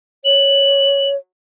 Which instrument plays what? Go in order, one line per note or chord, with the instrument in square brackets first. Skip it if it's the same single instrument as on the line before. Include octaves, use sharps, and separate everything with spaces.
[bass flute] C#5 [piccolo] F#7